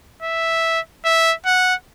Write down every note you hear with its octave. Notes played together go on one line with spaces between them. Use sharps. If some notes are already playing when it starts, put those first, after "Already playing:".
E5
E5
F#5